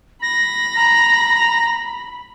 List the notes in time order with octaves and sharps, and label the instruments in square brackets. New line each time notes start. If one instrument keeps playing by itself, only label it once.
[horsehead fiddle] B5 [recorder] A#6
[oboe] A#5